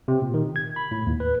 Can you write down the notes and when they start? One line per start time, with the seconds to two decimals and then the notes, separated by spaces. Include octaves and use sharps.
0.08 C3
0.22 A#2
0.34 D#3
0.56 G#6
0.76 B5
0.91 A2
1.07 D#2
1.20 B4